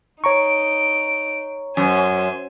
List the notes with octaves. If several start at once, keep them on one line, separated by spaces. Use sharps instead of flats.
D#4 C#5 A#5 C#6 D7
F#2 C5 G#5